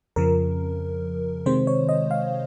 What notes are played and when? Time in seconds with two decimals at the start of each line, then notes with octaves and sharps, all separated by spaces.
0.16 F2 C#3 F3 A#4
1.46 C3 D#3 G#3 C4 C5
1.67 C#5
1.89 D#5
2.11 F5